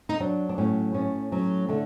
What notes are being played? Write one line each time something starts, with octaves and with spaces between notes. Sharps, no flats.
D#4
F#3 D4
D4
A2 C#4
A2 C#4
F#3 C#4
D3 A3